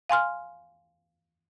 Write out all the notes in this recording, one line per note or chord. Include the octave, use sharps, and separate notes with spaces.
F5 G#5 C6 F6